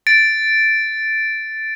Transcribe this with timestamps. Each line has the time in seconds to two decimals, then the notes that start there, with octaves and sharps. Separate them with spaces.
0.07 A6 D7